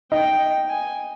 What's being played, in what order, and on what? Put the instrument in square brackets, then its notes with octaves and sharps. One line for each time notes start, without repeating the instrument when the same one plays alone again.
[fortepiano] D#4 [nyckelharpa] G5
[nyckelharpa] G#5